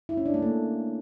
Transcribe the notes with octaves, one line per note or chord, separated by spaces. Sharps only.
E4
C#4
D4
A3
A#3